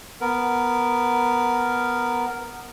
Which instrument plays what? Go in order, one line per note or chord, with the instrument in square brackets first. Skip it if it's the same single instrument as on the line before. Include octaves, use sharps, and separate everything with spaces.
[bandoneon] B3 A#4